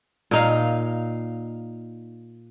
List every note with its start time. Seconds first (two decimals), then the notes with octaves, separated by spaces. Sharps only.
0.31 A#2 D#4 F5